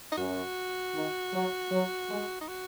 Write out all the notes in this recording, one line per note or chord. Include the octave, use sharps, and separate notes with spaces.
D#4
F#2 F#4
D#3
F#3
F#3
G#3
D#4
F#4